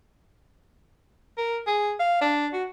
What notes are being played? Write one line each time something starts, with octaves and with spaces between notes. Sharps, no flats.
A#4
G#4
F5
D4
F#4